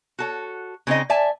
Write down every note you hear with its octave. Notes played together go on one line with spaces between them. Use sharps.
F#4 A4 C#5
C#3 C4 D#4 D#5
D5 E5 G#5 A5